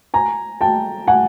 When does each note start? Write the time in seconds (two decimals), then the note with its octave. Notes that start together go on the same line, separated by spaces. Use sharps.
0.14 G#5 A#5
0.61 G5 A5
1.08 F#5 G#5